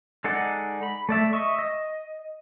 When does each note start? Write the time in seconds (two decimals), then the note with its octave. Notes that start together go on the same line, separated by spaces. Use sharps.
0.24 G#3 D#4 A4 D5 F#5
0.83 B5
1.09 A3 D5 E5
1.33 D#5 E5 C#6
1.59 D#5